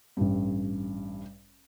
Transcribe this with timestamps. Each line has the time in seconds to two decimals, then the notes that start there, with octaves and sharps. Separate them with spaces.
0.17 A1 G2